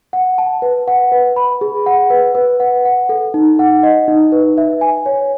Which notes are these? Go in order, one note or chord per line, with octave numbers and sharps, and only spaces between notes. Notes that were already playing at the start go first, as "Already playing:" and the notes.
F#5
A5
B4
F#5
B4
B5
G#4
F#5
B4
B4
F#5
F#5
A4
D#4
F#5
D#5
D#4
B4
E5
G#5
C#5